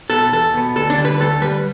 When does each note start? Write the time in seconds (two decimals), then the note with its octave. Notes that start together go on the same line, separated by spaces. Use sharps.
0.10 B2 B3 A4
0.33 E2 A4
0.53 B2 B3
0.76 D2 A4
0.90 D4
0.98 D3 G3
1.05 B4
1.20 D2 A4
1.41 D3 G3 B4